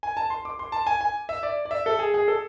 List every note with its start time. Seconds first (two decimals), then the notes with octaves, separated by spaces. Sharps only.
0.03 G#5
0.17 A5
0.30 C6
0.45 D6
0.59 C6
0.72 A5
0.87 G#5
1.01 G#5
1.29 E5
1.43 D5
1.65 D5
1.71 E5
1.86 A4
1.99 G#4
2.14 G#4
2.28 A4